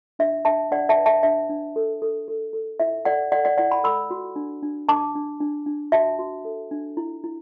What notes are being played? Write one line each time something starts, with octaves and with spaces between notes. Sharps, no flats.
D4 E5
D4 E5 A5
D4 D5 F#5
E5 A5
B4
E5 A5
D4 E5
D4
A4
A4
A4
A4
E4 E5
A4 D5 F#5
A4 D5 F#5
D5 F#5
E4 D5 F#5
F#5 B5
A4 B5 E6
F#4
D4
D4
D4 A5 D6
D4
D4
D4
F#4 E5 A5
F#4
A4
D4
E4
E4